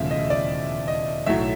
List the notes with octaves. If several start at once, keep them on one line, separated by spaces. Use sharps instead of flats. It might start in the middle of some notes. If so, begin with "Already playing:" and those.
Already playing: E1 D#2 C#3 F3 A3 E5 F5
D#5
D5
D#5
B1 A2 F#3 E5